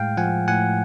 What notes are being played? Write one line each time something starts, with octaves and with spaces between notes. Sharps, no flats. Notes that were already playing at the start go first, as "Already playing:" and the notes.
Already playing: A2 G#3 F5 G5
F3 F#5 G#5
A2 F#5 G#5